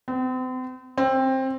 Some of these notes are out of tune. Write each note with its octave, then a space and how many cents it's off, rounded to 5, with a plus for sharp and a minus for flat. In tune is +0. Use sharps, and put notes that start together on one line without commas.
C4 -40
C4 +15